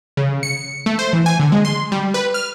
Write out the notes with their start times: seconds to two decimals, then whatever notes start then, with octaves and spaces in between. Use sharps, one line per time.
0.17 C#3
0.43 C#7
0.86 A3
0.99 C5
1.13 E3
1.26 G#5
1.40 D3
1.52 G#3
1.65 C6
1.92 G3
2.14 B4
2.34 F6